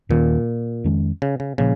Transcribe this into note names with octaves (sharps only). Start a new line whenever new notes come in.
D#2 A#2 D#3 C#4
F2 D#3 G#3 C#4
C#3
C#3
A#2 C#3 F3 A#3